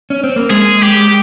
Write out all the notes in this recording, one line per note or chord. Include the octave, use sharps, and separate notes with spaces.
C#4
C4
A#3
G#3 G#4
G4